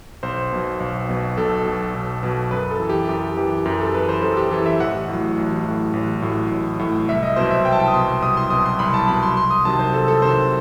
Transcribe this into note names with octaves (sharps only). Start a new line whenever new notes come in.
B1 C5
B2 F#3
B1
B2 F#3
B1 A4
B2 F#3
B1
B2 F#3
F#2 B4
A4
E3
G4
F#2 G4
E3 G4
F#2 G4
A4
E3 B4
C5
F#2 A4
G4
E3 A4
E5
A1 F#5
A2 F#3
A1
A2 F#3
A1
A2 F#3
A1
A2 F#3
C2 E5
D#5
B2 F#3 C5
E5
C2 G5
A5
G5
D#6
B2 F#3 C6
C2 D#6
C6
B2 F#3 D#6
C6
C2 B5
A5
B2 F#3 B5
C6
C2 C6
D#6
C3 D#3 F#3 A5
C5
C2 A4
A4
C3 D#3 F#3 C5